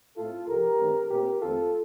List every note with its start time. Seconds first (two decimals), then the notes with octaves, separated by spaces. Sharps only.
0.16 A2 A3 C4 F4 A4
0.48 C2 C3 F3 G4 A#4
0.79 G2 D#3 A3 C4
1.10 A#2 A3 C4 G4 A#4
1.41 F2 D#3 A3 C4 F4 A4